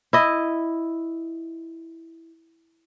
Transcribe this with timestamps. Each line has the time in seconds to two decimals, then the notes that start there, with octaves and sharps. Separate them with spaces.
0.13 E4 D#5